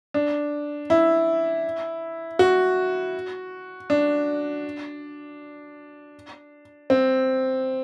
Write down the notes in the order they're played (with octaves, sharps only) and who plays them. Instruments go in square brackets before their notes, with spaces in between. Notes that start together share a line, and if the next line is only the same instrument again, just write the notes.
[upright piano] D4
E4
F#4
D4
C4